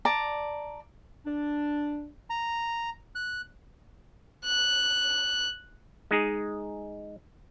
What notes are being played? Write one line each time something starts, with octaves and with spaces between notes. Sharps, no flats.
D5 A5 A#5
D4
A#5
F#6
F#6
G#3 D#4 G#4